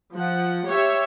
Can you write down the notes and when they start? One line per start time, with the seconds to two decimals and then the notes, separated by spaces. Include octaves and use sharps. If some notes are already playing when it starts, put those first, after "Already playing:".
0.14 F3 F#5
0.67 G4 C#5 E5